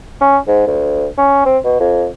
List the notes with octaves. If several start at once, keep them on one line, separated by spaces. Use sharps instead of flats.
C#4
G#2
D2
C#4
C4
B2
F2